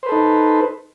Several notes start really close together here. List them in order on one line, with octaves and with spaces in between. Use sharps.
C5 B4 A4 D#4